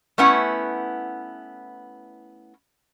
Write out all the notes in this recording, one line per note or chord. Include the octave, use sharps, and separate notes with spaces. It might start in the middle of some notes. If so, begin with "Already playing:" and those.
A3 B3 C#4 E4 F#5